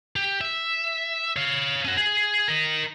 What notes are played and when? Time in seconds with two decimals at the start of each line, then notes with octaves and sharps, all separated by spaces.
0.16 G4
0.41 E5
1.36 C#5 F5
1.85 C#4 F#4
1.97 G#4
2.48 A#4 D#5